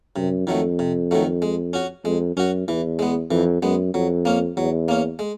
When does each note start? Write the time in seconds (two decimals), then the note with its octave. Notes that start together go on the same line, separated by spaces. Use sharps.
0.16 F#2 C3
0.47 F2 D#3 F#3 A3
0.79 C3
1.11 D#3 F#3 A3
1.42 G#3
1.73 C#4 F#4
2.05 F2 G#3
2.37 F#2 C#4 F#4
2.68 E2 E3
2.99 G#3 B3
3.31 F2 E3
3.62 F#2 G#3 B3
3.94 F2 F#3
4.25 A#3 C#4
4.57 E2 F#3
4.88 A#3 C#4
5.19 G#3